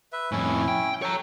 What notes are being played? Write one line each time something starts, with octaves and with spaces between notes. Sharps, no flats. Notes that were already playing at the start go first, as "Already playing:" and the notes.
B4 E5
F2 A2 C#4 E4
G5
A4 C#5 G5 A#5